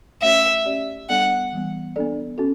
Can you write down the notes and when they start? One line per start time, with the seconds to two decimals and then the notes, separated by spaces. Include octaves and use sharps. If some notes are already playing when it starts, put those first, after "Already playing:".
0.22 A3 C#4 F#4 C#5 E5
0.65 C#4 G4 D5
1.09 G3 B3 D4 A4 D5 F#5
1.53 E3 G3 B3
1.96 B3 D4 A4 D5
2.38 C#4 F#4 A4